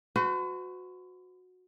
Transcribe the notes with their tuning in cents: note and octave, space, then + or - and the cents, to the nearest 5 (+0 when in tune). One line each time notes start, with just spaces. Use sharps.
F#4 -15 B4 +45